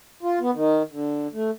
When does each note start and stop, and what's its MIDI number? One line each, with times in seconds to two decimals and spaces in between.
0.23 0.39 65
0.40 0.51 59
0.54 0.83 51
0.92 1.27 50
1.33 1.51 57